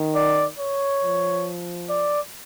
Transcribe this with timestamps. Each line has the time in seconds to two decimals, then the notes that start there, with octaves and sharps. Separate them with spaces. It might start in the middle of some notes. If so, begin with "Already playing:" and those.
Already playing: D#3
0.15 D5
0.59 C#5
1.03 F3
1.90 D5